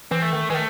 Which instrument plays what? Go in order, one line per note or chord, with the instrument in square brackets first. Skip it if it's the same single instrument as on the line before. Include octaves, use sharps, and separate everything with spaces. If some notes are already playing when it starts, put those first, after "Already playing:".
[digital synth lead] E3 [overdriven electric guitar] C4
[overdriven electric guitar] A3
[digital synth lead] D#3
[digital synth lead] E3 [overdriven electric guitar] G#3
[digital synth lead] D#3 [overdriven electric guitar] A3